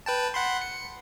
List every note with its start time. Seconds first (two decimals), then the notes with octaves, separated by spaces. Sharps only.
0.06 B4 G5 A5
0.34 F#5 B5 C6
0.61 C#7